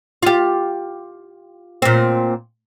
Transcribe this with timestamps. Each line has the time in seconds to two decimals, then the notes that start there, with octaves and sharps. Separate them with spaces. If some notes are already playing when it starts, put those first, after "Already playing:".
0.22 F4 G4
1.82 A#2 C4